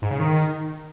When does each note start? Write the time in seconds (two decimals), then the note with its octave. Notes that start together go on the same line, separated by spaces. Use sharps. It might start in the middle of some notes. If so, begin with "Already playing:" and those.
0.02 G#2
0.11 C#3
0.19 D#3